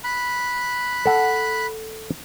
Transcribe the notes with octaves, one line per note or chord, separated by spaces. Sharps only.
B5 F#6
A4 F#5